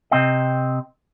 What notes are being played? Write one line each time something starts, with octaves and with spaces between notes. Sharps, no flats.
C3 C4 D#5